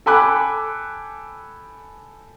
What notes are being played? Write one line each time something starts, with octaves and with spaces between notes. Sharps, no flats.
A4 G5 G#5 B5 D6 F#6